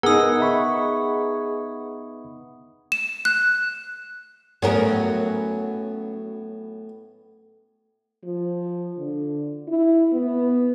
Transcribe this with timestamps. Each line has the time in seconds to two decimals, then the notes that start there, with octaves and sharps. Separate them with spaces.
0.03 B3 D#4 G#4 A#4 F#5 D#6 E6
0.40 E5 B5 C#6
2.92 E7
3.25 F#6
4.62 A2 F#3 B3 C#4 G#4 A#4
8.24 F3
8.98 D3
9.68 E4
10.13 B3